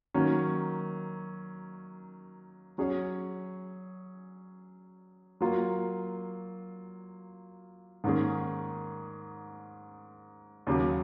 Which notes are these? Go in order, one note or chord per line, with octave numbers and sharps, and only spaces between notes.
D#3 F#3 A#3 C#4
F#3 C#4 G#4 C#5
F#3 A#3 F4
G#2 D#3 A#3 C#4 G#4
D#2 C#3 F#3